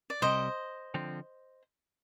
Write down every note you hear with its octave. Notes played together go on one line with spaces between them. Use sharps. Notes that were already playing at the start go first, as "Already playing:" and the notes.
D5
C2 C3 G3 C5 D#5
D3 F3 C4